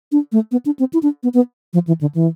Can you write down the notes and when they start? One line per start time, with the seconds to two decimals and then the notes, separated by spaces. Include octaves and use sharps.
0.12 D4
0.32 A3
0.52 B3
0.66 D4
0.79 C4
0.93 E4
1.03 D4
1.23 B3
1.34 B3
1.73 F3
1.87 E3
2.01 D3
2.15 E3